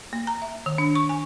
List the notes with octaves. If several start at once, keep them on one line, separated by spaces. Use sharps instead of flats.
A#3
A#5
E5
D#3
D4
C#6
G#5